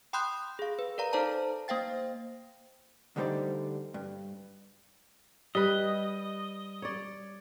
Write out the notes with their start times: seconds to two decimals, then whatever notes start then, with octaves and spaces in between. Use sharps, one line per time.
0.13 G5 B5 C6 D#6 F#6 G6
0.59 G#4 F5
0.79 B4
0.98 A#4 D5 F5 A#5
1.13 D#4 A4 C5 D5 A5 A#5
1.68 A#3 C5 F5 G5 A6
3.16 D2 D3 G3 D#4 C5 D5
3.94 G2
5.55 G3 B4 D#5
6.82 C#5 D5